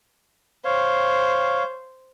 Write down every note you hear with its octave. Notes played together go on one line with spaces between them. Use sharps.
C5 C#5 F5